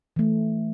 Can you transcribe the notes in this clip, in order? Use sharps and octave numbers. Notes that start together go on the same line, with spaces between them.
E3 A3